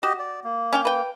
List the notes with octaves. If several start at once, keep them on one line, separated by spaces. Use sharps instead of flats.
F#4 G4 D#5
D5
A#3
C#4 F5 G5
B4 G5